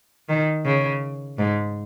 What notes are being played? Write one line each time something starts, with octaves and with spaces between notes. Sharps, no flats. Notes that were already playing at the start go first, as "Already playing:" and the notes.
D#3
C#3
G#2